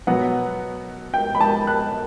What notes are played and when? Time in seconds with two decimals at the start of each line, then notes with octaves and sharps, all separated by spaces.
0.07 B2 F#3 B3 F#5
1.14 G5
1.35 B5
1.41 A5
1.67 F#6